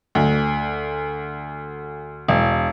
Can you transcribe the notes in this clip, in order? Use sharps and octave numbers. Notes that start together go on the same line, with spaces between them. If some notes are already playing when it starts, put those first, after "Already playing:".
D2
E1